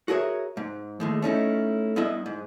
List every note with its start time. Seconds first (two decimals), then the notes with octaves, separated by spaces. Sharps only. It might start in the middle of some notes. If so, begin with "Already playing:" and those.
0.08 F#4 G#4 A#4 C#5 E5
0.57 G#2
1.00 D#2 A2 G#3
1.22 A3 C#4 D#4 E4
1.96 G2 B3 E4 D#5 E5
2.26 G#2